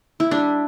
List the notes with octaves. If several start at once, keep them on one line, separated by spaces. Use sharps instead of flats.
E4
G3 D4